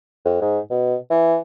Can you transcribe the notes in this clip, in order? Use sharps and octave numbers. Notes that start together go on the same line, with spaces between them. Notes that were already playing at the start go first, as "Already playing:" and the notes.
F2
G#2
B2
E3